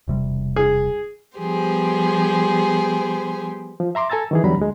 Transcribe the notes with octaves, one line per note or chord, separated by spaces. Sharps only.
E1 C3 G3
G#4
F3 G3 B3 G4 G#4 C5
F3
E5 A#5 C6 D6
A4 G#5 A#5 E6 A6
D#3 E3 G#4
E2 D3 F#3 G3 A#5 B5
D2 G#3